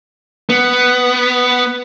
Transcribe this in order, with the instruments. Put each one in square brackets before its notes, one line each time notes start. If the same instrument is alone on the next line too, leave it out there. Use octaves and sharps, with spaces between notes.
[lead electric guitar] B3